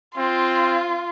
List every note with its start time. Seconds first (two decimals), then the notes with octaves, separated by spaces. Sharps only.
0.17 C4 F4